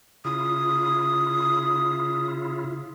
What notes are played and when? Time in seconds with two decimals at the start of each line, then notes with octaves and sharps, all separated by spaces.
0.25 C#3 E4 F4 D#6